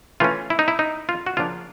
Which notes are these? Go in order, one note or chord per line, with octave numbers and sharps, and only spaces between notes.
E3 A3 C#4 F4
E4
D#4
E4
D#4
F4
F#4
C#3 F3 A#3 D4 F4